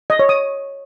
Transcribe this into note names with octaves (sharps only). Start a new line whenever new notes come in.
D#5
C#5
D#6